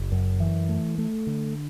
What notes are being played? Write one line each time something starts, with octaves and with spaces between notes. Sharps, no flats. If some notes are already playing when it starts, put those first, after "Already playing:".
Already playing: F#1
F#2
E3
A3
A3
D3